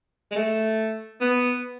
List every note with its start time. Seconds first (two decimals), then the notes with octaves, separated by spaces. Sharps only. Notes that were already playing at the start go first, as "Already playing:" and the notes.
0.31 G#3
0.36 A3
1.21 B3